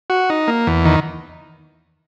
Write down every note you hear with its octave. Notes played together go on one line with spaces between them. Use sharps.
F#4
D#4
A#3
E2
D#3